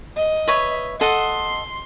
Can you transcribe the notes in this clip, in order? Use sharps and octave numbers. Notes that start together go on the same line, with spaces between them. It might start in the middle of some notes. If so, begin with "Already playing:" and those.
D#5
B4 C#5 E5
A4 D#5 F#5 C6